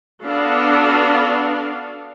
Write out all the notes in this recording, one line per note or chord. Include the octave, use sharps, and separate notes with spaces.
B3 D4 F#4 A4 F5